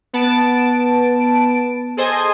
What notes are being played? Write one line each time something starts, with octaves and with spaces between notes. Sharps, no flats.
B3 A5 D7
G#4 A4 C5 D#5 G#5